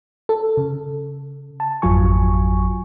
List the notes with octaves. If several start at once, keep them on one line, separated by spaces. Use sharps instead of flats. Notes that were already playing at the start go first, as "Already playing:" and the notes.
A4
C#3
A5
G#1 F2 F#3 F4 G#5 C#6